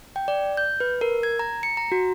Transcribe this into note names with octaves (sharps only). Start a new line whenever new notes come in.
G5
D5
G6
B4
A#4
G#6
A#5
C#7
A#5
F#4